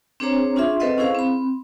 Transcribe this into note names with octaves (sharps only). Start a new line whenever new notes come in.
C4 D4 G#4 C5 C#5 A#5
C#4 D4 F4 G#4 E5 C6
C4 A4 B4 C5 D#5 F#5
C#4 E4 G#4 C5 F5
C4 B5